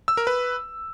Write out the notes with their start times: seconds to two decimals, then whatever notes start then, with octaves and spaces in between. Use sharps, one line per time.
0.08 E6
0.17 A#4
0.27 B4